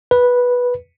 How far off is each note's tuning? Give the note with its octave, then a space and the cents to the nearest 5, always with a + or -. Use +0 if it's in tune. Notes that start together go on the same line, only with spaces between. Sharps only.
B4 -10